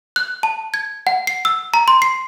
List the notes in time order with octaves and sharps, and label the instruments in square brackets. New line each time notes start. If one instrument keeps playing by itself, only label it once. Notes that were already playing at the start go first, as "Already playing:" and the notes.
[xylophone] F#6
A5
G#6
F#5
C7
E6
A#5
C6
C7